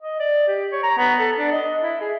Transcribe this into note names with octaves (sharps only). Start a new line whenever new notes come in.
D#5
D5
G4
C#5
A#5
B3
A4
D4
D#5
E4
G#4